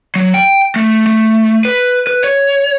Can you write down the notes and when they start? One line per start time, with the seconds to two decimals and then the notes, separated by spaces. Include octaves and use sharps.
0.16 F#3
0.34 G5
0.76 A3
1.07 A3
1.65 B4
2.07 B4
2.24 C#5